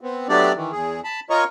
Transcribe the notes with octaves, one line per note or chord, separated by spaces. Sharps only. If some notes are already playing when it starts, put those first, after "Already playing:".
B3 C4
F#3 A3 B3 D4 G4 D5
D#3 E3
E2 G#4
A5 B5
F4 A#4 C#5 D#5 A#5 C#6